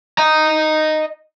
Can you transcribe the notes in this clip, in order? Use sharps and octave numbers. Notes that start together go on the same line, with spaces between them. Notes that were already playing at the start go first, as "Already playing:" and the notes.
D#5 A#5